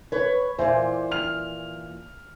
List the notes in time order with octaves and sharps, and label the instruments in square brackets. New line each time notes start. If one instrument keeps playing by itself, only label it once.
[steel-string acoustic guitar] B4 C#5
[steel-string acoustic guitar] A#2 E3 [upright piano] C5
[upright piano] F6 F7